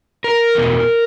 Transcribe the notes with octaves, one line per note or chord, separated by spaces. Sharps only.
A#4
E2 B2